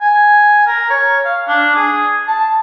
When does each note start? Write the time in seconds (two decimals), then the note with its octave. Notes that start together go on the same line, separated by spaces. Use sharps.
0.01 G#5
0.67 A#4
0.90 C#5
1.25 F5
1.48 D4
1.76 G#4
2.28 A5